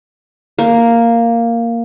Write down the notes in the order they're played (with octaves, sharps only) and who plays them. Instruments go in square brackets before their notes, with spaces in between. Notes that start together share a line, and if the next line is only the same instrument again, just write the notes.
[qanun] A#3